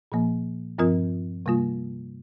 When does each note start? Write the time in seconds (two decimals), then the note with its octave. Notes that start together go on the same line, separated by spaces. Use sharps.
0.12 A#2 F3 A#3
0.78 G2 F3 C4 F4 A#4
1.46 C3 G3 A#3 F4